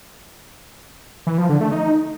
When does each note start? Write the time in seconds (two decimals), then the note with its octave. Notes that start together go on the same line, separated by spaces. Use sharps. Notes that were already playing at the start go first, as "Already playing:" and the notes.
1.27 E3
1.38 F3
1.49 D3
1.61 A3
1.72 D#4